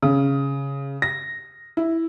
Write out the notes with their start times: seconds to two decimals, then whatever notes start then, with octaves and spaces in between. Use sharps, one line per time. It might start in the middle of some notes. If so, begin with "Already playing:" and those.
0.02 C#3
1.02 A#6
1.77 E4